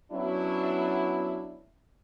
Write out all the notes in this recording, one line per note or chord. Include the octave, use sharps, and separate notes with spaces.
F#3 B3 C#4 D4 E4